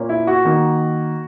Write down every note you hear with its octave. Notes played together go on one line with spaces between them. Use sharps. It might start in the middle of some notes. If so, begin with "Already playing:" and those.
Already playing: A#2 A#3 C#4
E4
F#4
D#3 A#3 D#4